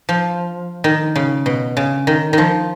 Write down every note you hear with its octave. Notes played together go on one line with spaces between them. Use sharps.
F3
D#3
C#3
B2
C#3
D#3
D#3 F3